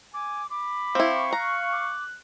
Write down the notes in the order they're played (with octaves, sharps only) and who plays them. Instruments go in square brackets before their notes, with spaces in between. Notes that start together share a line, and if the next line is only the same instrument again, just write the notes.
[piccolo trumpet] G#5 [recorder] D6
[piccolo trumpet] B5 [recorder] D6
[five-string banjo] C4 E4 [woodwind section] F5 C#6
[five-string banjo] A#5 [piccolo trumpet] F#6
[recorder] D6